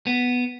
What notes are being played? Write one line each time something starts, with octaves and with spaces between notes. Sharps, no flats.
B3